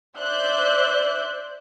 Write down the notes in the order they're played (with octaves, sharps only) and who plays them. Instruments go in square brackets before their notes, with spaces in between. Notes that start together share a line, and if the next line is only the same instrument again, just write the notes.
[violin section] C5 D5 E5 F#6 G6